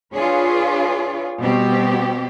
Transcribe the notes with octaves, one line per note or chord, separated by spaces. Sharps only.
D4 F4 G#4 B4 C#5
B2 G3 C4 F#4 G4